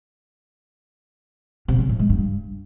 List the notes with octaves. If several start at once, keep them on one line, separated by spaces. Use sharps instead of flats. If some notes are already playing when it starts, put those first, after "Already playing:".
C3
C#3
A2
G#3
G2